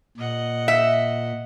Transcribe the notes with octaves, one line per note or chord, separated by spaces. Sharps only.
A#2 D#5 F#5
E5